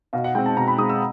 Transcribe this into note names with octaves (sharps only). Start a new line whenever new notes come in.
B2 F5
F#5
G#3 C4 G5
A5
B2 A#5
B5
G#3 C4 D#6
E6